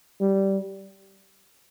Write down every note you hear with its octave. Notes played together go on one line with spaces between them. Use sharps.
G3